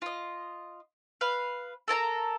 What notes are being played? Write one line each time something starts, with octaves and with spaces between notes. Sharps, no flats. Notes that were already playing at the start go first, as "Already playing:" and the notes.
F4 D#5
B4 F5
A4 A#4 A5 A#5